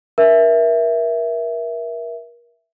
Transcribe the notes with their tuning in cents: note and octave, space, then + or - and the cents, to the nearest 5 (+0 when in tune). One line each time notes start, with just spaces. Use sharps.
A#4 +30 E5 +0